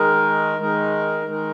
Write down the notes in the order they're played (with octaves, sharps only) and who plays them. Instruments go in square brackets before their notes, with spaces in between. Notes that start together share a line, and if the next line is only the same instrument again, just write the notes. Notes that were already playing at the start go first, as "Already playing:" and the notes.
Already playing: [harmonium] D#3 G#3 D#4 A#4
D#3 G#3 D#4 A#4
D#3 G#3 D#4 A#4